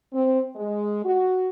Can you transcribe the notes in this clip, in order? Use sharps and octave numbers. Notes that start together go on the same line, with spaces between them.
C4
G#3
F#4